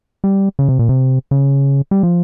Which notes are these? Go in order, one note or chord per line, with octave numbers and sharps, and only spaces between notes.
G3
C#3
C3
A#2
C3
C#3
G3
F3